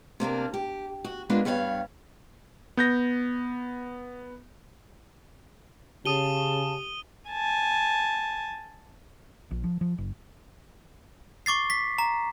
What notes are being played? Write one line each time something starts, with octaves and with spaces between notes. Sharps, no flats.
C3 A#3 D4 A#4
G4
F#4
G#3 A#3 B3 D4 F4
G2 G3 B3 C#5 F5
B3 G6 A#6
C#3 G4 A5 D#6 D#7 G7
G#5 A5
A#1
F3
F3
F#1
C#6 D6 A6 C7
B6
A#5